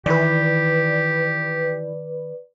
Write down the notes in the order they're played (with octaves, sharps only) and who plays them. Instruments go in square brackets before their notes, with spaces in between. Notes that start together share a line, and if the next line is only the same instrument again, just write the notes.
[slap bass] D#3 [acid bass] E3 [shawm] G4 [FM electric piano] B4 D5